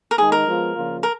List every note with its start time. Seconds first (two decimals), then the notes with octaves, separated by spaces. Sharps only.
0.11 A#4
0.18 D#3 G#3 D#4 G#4
0.32 A#4
0.47 F3 G#3 B3 F4
0.74 C#3 F3 A#3 F4
1.03 A#4